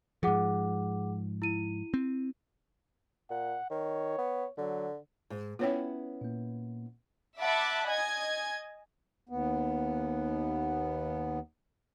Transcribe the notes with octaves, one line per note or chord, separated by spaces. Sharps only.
G#2 F3 G#4 F#5 D6
E4 D#7
C4
A#2 F#5
D#3 C#5
B3
D3 F#3
G#2
B3 C#4 E4 F4 C#5 G5
A#2 A#3
E5 F#5 A5 B5 D6
D#5 G#5 G#6
D#2 B3